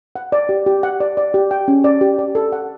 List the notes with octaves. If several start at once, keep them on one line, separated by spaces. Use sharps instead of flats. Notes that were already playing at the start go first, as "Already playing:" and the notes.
F#5
D5
G4
G4
F#5
D5
D5
G4
G5
C#4
D5
G4
D5
A4
F#5